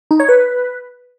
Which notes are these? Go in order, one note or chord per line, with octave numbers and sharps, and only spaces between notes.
D#4
C#5
B4